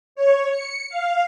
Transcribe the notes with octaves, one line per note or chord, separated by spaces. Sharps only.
C#5
C#7
F5